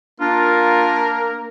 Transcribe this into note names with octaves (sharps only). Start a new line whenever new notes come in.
A#3 D4 F4 A#4